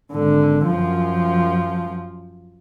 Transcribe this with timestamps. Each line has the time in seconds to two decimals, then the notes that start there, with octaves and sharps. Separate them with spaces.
0.13 G#1 D3
0.67 F#2 F3